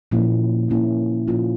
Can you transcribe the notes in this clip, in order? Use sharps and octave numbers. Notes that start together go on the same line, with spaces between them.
A#2 F3 A#3 C#4 E4
A#2 F3 A#3 C#4 E4
A#2 F3 A#3 C#4 F4